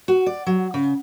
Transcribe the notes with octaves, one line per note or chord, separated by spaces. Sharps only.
F#4
D5
F#3
C#3